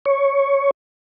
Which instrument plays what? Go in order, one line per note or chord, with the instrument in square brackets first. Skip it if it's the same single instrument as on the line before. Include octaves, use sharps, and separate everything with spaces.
[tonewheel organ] C#5